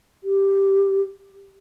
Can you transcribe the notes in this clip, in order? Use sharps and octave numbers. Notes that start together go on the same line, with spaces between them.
G4